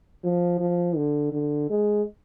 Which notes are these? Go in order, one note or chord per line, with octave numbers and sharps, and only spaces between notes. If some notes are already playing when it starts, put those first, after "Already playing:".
F3
F3
D3
D3
G#3